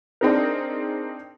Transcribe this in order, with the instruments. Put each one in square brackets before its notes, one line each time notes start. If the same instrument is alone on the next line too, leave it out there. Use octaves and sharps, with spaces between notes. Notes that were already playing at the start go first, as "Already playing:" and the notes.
[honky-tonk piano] C4 D4 D#4 G#4 A#4